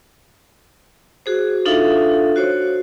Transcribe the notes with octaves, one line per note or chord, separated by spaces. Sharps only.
F#4 G#4 C5
D4 D#4 F4 A4 E5 F5
F#4 C5 C#5